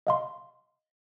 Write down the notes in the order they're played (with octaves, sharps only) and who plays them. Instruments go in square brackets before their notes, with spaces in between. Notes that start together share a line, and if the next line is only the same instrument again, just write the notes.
[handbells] D#5 F5 C6